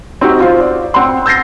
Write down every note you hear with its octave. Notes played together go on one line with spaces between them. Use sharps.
C4 D#4 F#4 G4
F4 C5
D5
C4 F#5 C6
E6 G6 A6 A#6 C7